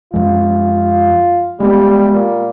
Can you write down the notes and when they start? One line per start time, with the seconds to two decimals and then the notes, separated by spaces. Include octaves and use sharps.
0.14 F#2 F3 G#3 F4
1.60 G3 G#3 A#3 B3
2.12 A#2